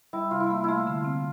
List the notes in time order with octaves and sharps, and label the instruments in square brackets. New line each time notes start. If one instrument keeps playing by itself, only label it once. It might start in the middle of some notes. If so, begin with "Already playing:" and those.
[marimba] G3 [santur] E4
[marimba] C3 [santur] F4
[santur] E4
[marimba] A#3
[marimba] A3 [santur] E4 F4
[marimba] D3
C4